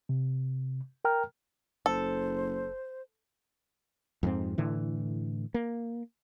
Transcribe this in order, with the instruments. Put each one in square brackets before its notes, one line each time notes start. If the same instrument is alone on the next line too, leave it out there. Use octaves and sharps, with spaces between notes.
[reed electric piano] C3
A#4 G5 A#5 F6
[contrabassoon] F#1 [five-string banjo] A4 [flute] C5
[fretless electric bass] F2 G#2 C4
A2 D3 E3
A#3